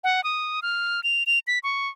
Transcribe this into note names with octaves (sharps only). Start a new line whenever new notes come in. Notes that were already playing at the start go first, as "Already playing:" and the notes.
F#5
D#6
F6
F7
F7
B6
C#6